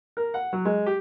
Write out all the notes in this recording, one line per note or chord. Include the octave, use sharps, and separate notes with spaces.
A#4
F#5
F#3
G#3
G4